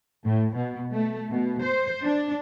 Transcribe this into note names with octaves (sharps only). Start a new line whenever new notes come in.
A2
B2
A3
B2
C5
D4